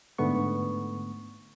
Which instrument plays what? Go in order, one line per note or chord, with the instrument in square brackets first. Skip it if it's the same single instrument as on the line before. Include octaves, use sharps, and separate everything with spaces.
[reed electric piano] G#2 D3 A3 B3 C#6